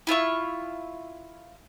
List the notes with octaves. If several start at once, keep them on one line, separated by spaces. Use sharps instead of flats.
E4 F4 E5 C#6